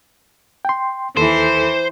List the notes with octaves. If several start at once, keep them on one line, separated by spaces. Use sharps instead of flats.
G5 C6
D#2 E3 A4 C5